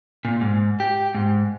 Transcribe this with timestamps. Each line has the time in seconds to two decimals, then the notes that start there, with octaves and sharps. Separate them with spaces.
0.25 A#2
0.41 G#2
0.80 G4
1.15 G#2